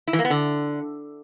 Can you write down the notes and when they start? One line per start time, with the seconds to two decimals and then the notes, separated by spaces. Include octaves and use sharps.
0.08 E4
0.13 E3
0.19 A#3
0.25 B3
0.30 D3